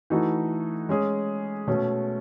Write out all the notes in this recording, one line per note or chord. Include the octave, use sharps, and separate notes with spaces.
E3 A3 D#4 F#4 A4
G#3 C#4 G#4
B2 A3 C#4